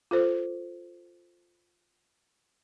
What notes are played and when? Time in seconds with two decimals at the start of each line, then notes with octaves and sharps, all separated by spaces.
0.11 F4 A4 C5